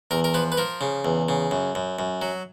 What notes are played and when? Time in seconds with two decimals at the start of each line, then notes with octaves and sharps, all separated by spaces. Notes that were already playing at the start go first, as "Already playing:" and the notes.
0.11 E2 A#4
0.24 A#4
0.34 F3 B4
0.52 B4
0.57 F3 A#4
0.81 C#3
1.05 E2
1.29 C#3
1.51 F#2
1.75 F#2
1.99 F#2
2.22 F#3